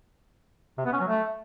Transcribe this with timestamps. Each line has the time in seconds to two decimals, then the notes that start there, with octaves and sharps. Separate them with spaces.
0.78 C3
0.85 B3
0.93 C#4
1.00 F#3
1.07 A3